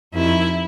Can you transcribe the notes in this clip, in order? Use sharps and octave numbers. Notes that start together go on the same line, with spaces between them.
F2 C3 D#3 E4